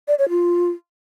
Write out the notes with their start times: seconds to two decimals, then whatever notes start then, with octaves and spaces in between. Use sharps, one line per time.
0.08 D5
0.19 C#5
0.29 F4